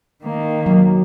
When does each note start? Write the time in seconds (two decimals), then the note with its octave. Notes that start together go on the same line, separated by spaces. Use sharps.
0.24 D#3 A#3
0.66 F#3